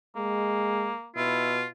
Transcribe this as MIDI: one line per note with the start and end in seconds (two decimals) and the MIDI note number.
0.16 0.94 56
0.16 1.08 58
1.16 1.65 47
1.16 1.54 64
1.16 1.66 65